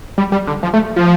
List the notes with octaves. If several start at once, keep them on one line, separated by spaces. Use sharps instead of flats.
G3
G3
D3
F3
A3
F3